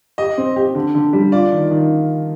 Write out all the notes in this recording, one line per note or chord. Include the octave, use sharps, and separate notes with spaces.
G4 D#5
C4
G4
D3
D3
G3
F4 D5
D#3
D#3